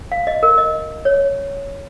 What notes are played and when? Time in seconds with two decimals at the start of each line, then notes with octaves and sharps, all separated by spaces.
0.12 F5
0.27 D#5
0.43 A#4
0.58 D#5
1.05 C#5